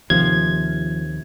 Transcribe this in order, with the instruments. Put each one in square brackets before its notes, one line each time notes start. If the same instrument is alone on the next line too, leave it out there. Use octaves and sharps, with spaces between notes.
[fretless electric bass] D#2 C3 [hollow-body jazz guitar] F3 [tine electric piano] G#6